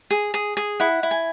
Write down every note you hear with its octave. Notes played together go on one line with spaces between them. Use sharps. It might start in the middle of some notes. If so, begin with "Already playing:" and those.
G#4
G#4
G#4
E4 F#5
E4
G#5